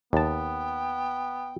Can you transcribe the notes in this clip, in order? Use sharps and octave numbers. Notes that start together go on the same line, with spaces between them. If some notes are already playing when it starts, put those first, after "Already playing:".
D#2 B3 G5 A5